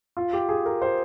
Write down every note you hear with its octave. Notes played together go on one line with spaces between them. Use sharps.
F4
G4
G#4
A#4
C5